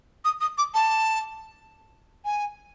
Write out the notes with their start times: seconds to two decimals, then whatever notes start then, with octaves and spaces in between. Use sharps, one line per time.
0.25 D#6
0.41 D#6
0.58 D6
0.74 A5
2.25 G#5